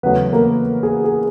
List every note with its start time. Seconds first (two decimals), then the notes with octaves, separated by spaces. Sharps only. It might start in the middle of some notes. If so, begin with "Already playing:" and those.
0.03 E2 C#3 F#3 A3 B3 B4
0.33 A#3 A#4
0.83 G#4
1.04 G#4